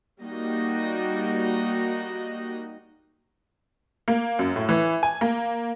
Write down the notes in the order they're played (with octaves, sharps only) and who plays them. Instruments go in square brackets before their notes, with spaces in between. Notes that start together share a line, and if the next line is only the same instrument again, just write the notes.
[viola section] G3 A#3 D#4 F#4 D#5
[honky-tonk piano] A#3
F#2
A2
E3
G#5
A#3